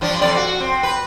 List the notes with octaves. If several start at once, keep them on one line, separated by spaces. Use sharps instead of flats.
G2 F3 D4
F2 C3 D5
F#4
C4
B4